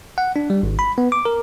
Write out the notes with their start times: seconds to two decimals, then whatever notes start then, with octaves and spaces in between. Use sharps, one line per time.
0.18 F#5
0.36 D4
0.50 G3
0.63 G#1
0.79 B5
0.98 B3
1.12 D6
1.25 A#4